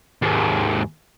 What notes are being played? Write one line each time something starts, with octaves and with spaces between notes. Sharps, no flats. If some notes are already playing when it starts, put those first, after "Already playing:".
D#2 G#2